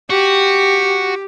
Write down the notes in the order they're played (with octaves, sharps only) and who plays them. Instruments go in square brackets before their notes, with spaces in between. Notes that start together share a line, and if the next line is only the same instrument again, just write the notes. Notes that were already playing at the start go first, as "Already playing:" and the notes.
[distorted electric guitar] F#4 [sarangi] G4